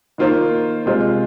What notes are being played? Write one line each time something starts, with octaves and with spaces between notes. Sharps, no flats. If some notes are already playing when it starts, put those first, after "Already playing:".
D#3 A#3 F4 C5
C3 G#3 F4 C5